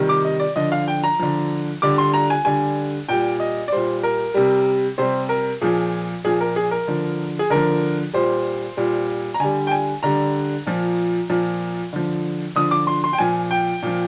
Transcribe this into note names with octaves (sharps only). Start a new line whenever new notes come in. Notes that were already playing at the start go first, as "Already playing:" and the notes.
Already playing: C3 D#3 G3
D6
D#5
D5
D3 F3 D#5
F5
G5
A#5
D3 F3
D3 G3 D6
C6
A#5
G#5
D3 G3 G#5
A#2 G3 G5
D#5
D5
A#2 G3 C5
A#4
C3 G3
C3 G3 C5
A#4
A#2 F3 G#4
A#2 F3 G#4
A#4
G#4
A#4
D3 F3
G#4
D3 F3 A#4
A#2 G3 C5
A#2 G3
A#5
D3 G3 G#5
G5
G#5
D3 G3 A#5
A#2 F3
A#2 F3
D3 F3
D3 F3 D#6
D6
C6
C6
G5
A#2 F3 G#5
G5
A#2 F3